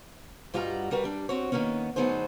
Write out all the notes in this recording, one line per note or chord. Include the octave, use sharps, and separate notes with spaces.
G2 G3 F4 F#4 D#5 A#5
G3 F#4 A#4 B4
G3 D4
C4 F#4 C#5
D#3 F3 A#3 B3 C#4
D2 F#3 B3 D#4 G#4 C5